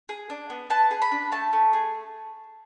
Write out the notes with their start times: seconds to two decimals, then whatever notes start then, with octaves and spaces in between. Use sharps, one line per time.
0.09 G#4
0.30 D4
0.50 B3
0.70 B3 A5
0.91 G#4
1.02 B5
1.11 D4
1.32 A3 A5
1.53 A3
1.73 G#4